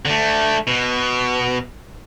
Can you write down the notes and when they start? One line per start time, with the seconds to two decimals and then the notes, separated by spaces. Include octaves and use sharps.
0.05 D3 A3
0.67 B2